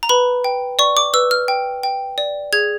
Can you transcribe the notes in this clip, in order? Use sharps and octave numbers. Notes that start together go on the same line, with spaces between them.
A#5
B4 B5
G5
D5 C#6
D6
B4 E6
F6
G5
G5
D5
G#4 G#6